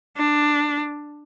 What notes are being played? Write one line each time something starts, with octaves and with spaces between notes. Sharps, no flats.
D4